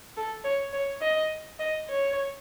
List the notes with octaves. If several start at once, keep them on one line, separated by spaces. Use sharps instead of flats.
A4
C#5
C#5
D#5
D#5
C#5